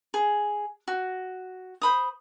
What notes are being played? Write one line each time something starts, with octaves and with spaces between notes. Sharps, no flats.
G#4
F#4
C5 B5 D#6